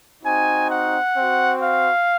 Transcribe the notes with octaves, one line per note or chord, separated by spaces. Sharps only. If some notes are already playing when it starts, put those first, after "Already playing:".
C4 D#4 F#4 G#5
F#5
C4 F#4
F5